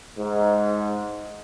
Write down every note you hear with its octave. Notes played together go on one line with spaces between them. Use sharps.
G#2